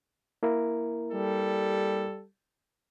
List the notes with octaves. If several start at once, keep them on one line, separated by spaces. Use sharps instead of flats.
A#3 E4 A#4
G3 A4